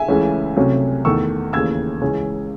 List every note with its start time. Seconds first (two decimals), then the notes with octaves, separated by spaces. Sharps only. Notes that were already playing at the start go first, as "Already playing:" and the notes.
Already playing: E5 G#5
0.08 C#2 C#3 E3 A3 C#4
0.56 C2 C3 F#3 A3 C#4
1.05 E2 D#3 A3 C#6 E6
1.53 D#2 C#3 E3 A3 E6 G#6
2.01 C#2 C#3 E3 G#3 C#4